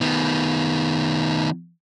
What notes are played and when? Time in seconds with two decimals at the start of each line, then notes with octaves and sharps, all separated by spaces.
0.01 D#3 B3